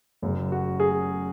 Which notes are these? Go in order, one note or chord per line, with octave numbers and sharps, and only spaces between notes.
F#1 F#2 C#3
F#4
G#4